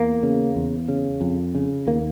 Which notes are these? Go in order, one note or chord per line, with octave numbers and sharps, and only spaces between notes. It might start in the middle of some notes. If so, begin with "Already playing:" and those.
Already playing: E2 A#3
C#3
E2
C#3
F2
C#3
D#2 A#3